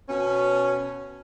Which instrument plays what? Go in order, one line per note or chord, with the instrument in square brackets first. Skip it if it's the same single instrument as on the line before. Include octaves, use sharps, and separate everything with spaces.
[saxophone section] B2 C#4